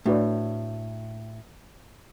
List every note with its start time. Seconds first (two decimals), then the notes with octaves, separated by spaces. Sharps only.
0.06 A2 A3 D4 F#4 B4 D5